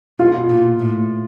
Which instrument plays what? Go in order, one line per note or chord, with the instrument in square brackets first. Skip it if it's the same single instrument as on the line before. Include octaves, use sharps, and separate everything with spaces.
[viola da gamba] B2 [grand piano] F4
[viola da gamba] A#2
A2